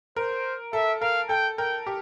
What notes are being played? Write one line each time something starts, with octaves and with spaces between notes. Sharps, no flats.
A#4 C5
A4 E5
A#4 F5
A4 G5
A#4 G5
G4